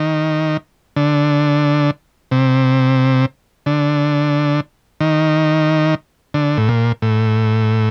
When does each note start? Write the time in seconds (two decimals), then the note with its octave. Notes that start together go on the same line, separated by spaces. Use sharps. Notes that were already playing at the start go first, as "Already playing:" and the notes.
Already playing: D#3
0.96 D3
2.31 C3
3.66 D3
5.01 D#3
6.34 D3
6.57 A2
6.69 A#2
7.02 A2